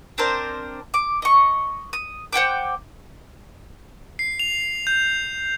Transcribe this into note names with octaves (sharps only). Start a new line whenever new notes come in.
C4 D4 A#4 C5
D6
D#5 C#6
D#6
C5 F#5 G5 D6
C7
F7
G6